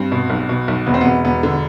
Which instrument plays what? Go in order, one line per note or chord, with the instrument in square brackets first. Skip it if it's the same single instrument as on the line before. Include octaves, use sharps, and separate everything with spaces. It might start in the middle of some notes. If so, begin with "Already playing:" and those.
Already playing: [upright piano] G2 C4
B2
B1
B2
B1
E1 B3
C4
E1 B3
E1 B3
D3